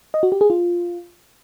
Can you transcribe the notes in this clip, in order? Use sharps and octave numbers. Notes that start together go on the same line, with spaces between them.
D#5
F#4
G4
G#4
F4